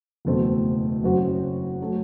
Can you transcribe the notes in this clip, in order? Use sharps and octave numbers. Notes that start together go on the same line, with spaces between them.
F#1 E2 B2 A3 C4
F#1 F#2 F#3 C4 F#4
F#3 A3